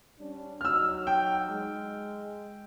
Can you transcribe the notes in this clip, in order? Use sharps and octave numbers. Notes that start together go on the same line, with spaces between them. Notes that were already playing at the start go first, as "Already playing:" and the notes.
G3 C#4 D4
F#3 D#4 E6 F6
G5
G#3